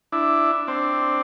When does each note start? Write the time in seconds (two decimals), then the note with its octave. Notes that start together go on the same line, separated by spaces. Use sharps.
0.12 D4 E4
0.67 C4 D4